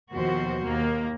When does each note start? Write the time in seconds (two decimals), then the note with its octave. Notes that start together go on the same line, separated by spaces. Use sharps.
0.12 D#2 B2 F3 F#4 C5
0.64 D#2 A#3